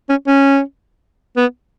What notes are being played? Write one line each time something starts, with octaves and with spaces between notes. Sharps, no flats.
C#4
C#4
B3